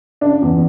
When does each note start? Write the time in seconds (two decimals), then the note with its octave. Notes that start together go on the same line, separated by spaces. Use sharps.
0.21 C#3 D4
0.42 E2